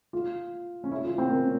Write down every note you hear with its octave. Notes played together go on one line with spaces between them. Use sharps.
F4
C#4
E4
F4
C4
A#3
C#4